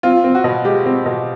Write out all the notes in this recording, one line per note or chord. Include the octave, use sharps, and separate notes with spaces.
C4 F4
C4
F#4
B2
G#3 G4
C4
B2